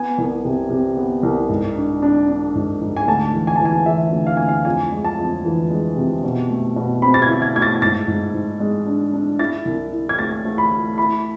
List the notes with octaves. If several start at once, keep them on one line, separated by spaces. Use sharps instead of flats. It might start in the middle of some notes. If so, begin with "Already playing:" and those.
Already playing: B3 G#5
C2
C3
C3
B3
C2
G#2
D4
D4
D4
G#2
G#2
G#5
D2 A5
E3
G#5
E3 A5
G#5
E3 E5
D2
F5
D2 G#5
F5
F2 G#5
G#3
A5
F2
E3
G#3
C3
B2
A3
B2
C4 B5
A6
G#6
E4
G#6
A3 G#6
A6
G#2 A6
G#2
G#2
G#3
D4
D4
E4 A6
C2
E4
G#6
A3 A6
A3
B5
A3
E4 B5